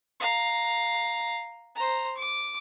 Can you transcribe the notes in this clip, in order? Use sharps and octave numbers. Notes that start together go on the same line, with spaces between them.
F5 A#5
C5 A#5
D6